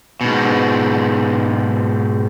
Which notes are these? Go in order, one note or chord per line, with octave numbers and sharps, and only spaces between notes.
G#2 B2